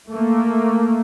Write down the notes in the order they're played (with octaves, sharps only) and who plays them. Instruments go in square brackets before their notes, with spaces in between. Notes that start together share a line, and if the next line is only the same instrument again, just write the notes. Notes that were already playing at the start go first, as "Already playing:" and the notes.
[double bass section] A3 A#3